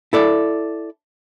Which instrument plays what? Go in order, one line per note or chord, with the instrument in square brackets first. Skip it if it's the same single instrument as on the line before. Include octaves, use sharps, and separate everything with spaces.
[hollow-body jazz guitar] E4 A4 D5